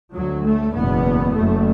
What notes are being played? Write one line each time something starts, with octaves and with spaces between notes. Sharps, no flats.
D2 F#3
A3
F#1 E2 B2 B3
F#1 F#2 A3